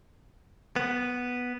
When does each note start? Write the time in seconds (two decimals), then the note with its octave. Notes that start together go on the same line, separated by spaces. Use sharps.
0.76 B3